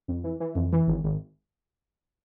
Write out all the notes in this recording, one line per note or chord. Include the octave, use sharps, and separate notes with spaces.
F2
E3
E3
F2
E3
G#1
G#1